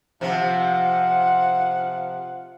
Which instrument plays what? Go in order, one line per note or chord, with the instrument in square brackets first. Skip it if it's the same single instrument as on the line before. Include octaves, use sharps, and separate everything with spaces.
[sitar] C3 F3 [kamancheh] F4 F#5